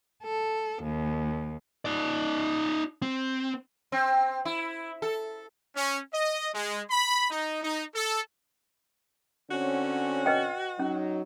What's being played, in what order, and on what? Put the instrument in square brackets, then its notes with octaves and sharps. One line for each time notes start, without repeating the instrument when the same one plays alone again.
[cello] A4
D#2
[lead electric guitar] D#4 D5
C4
[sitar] C4
E4
A4
[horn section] C#4
D#5
G#3
B5
D#4
D#4
A4
[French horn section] D3 C4 C#4 [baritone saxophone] F#4
[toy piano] B4 D#5 G5
[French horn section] F#3 D#4 [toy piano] C#4